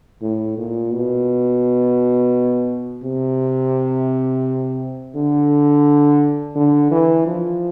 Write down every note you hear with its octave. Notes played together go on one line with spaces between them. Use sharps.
A2
A#2
B2
C3
D3
D3
E3
F3